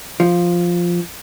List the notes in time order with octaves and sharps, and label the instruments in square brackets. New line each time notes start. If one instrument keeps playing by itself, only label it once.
[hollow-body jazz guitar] F3